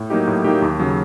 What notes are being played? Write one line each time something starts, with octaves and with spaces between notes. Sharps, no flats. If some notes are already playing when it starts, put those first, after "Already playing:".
Already playing: A2
F#3 A#3 D#4 G4
A2
F#3 A#3 D#4 G4
D#2
C#3 F#3